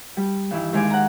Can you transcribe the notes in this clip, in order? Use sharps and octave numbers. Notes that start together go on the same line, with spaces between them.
G3
G2 D#3 E3 E4
D#2 D#3 G#3 D#4 G#5 D6
F#5 A#5